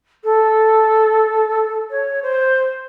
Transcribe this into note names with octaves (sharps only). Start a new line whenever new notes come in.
A4
C#5
C5